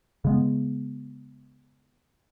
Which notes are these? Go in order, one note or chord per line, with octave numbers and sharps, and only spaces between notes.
C#3 G#3 B3